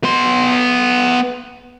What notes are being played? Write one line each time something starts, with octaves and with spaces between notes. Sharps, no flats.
B3 C6